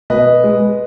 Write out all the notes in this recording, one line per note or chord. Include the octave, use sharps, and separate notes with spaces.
B2 B4 D#5
G#3